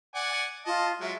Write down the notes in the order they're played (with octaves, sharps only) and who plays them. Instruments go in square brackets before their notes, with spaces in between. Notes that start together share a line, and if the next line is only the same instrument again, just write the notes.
[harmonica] D5 F#5 G#5
[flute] F4 [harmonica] D#5 A5
[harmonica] F#3 G#3 [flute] E5